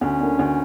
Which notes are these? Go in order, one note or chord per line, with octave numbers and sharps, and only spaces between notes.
D2 C#4
D3 A#3 D4
D2